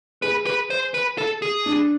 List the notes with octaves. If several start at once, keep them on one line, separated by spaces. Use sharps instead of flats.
G#4 B4
B4
C5
B4
A4
G#4
D4